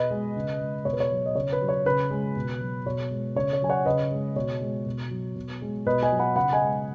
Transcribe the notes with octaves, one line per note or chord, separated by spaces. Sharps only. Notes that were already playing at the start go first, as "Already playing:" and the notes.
Already playing: B2 B4 D#5
G#3
C#3
G#3
B2 C#5
B4
C#5
F#3
D#5
C#3 C#5
B4
F#3
C#5
C#3 B4
G#3
B2
F#3
B2 C#5
G#3
C#3 C#5
C#5
F#3 G#5
C#5 F#5
C#3 B4 D#5
G#3
B2 C#5
G#3
B2
F#3
B2
G#3
B2 B4 D#5
D#5 G#5
F#3
F#5 B5
C#3 F#5 B5
D#5 G#5
G#3